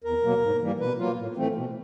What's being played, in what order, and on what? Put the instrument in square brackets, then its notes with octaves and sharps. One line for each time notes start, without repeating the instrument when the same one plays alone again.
[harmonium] E2 A#4
B2 F#3 A#3
G#2
E3 G3 A#3
B2 B4
F#3 A#3 F4
A2
E3 A3 C4
B2